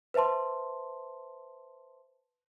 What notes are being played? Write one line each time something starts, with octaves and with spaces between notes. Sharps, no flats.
B4 C5 E5 A5 C6